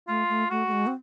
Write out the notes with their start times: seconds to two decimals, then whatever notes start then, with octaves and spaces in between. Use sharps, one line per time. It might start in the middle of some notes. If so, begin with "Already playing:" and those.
0.08 A3 F4
0.29 A3
0.50 A3 F#4
0.67 A3
0.72 G#3
0.87 C4